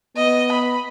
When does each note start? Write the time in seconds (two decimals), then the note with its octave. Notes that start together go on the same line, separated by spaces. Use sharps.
0.17 B3 D#5
0.52 B5